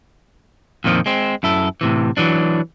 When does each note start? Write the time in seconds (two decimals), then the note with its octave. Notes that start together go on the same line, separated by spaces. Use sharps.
0.84 F2 A#2 D#3 F3
1.06 G#3 C4
1.43 F#2 E4 A4
1.81 A2 C3 E3
2.17 E3 F#3 D4